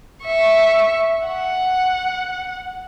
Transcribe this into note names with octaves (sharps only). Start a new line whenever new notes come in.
E5 C#6
F#5